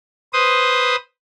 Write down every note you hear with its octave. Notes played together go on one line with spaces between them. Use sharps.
B4 C5 D#6